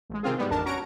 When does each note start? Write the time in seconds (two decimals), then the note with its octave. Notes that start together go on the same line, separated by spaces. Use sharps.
0.10 A1 G#3
0.23 C3 D#3 C4 F4 G#4
0.38 G#2 G3 B3
0.51 A1 F2 D4 A#4 A5
0.65 C#4 F#4 A#5 C#6 D7